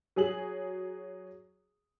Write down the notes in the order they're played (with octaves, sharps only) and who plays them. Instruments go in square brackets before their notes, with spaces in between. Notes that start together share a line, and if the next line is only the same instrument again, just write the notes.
[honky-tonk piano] F#3 G#4 F#7